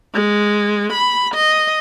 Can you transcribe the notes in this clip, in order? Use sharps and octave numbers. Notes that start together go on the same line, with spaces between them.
G#3
B5
D#5